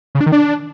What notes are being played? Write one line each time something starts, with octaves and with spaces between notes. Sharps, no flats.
C#3
D4
D#3
D4